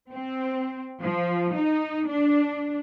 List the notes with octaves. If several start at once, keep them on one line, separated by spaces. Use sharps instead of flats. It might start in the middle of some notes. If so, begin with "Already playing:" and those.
C4
F3
D#4
D4